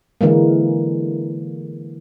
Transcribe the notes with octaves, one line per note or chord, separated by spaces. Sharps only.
D3 E3 G#3 A#3